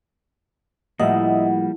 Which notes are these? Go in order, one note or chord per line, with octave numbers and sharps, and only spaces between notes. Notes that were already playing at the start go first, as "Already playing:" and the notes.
A2 F3 G3 A#3 D#5 E5 F#5